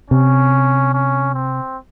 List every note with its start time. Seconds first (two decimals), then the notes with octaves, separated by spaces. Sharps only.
0.10 C3 C#4
0.94 C#4
1.34 C4